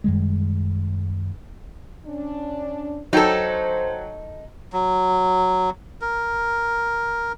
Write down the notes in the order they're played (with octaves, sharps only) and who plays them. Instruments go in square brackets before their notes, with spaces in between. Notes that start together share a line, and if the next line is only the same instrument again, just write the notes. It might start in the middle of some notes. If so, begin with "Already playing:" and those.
[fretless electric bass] F#2 D#3 G3 G#3
[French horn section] C#4 D4
[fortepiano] F#3 G5 [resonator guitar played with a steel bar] D#4 A4 [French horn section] C5
[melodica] F#3
A#4